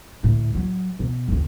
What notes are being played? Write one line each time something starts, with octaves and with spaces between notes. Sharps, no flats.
D2 A2
F#3
B2
F#1 D#2